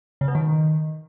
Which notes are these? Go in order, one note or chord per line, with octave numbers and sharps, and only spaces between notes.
C#3
B2
D#3